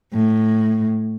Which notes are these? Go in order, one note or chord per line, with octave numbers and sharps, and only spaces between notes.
A2